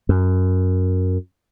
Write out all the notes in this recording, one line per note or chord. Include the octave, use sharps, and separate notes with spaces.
F#2